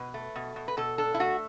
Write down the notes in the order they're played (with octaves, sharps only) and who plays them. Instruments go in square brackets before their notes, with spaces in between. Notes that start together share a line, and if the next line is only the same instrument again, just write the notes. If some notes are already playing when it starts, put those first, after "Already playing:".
Already playing: [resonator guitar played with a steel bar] B2 B4
A3
B2
B2
B4
B2 A4
D4 A4
E4
A3 F#4